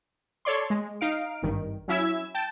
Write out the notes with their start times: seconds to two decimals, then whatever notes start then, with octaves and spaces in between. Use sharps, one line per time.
0.45 A4 C#5 D5 C6
0.70 G#3
1.01 D#4 F5 D7
1.42 G#1 G2 D#3
1.88 F#3 C#4 E4 E5 E6 G#6
2.34 G5 A5